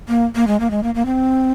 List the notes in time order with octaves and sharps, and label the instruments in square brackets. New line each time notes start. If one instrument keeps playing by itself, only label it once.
[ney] A#3
A#3
G#3
A#3
G#3
A#3
A#3
C4